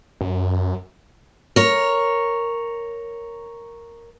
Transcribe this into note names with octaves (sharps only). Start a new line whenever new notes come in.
F#2
A#4 C#5